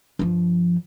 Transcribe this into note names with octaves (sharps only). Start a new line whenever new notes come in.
G2 F3